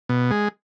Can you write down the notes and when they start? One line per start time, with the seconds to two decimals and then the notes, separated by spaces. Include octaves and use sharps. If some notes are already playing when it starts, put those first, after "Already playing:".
0.09 B2
0.31 G#3